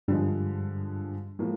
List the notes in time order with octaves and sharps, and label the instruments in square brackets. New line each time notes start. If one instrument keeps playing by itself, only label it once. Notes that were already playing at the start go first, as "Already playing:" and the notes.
[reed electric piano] G2 G3 [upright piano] D3 F3 G#3
[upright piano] A2 F3 A#3 [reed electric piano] G#3